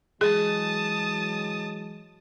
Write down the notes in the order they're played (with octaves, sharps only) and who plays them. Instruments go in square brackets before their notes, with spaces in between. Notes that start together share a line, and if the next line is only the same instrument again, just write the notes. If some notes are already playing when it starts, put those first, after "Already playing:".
[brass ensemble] E3 F#3 G#3 [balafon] G#4 [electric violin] A5 D#6